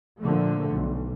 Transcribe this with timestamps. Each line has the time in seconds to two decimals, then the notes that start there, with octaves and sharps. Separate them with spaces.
0.21 A#2 D3 F3 A3
0.71 B1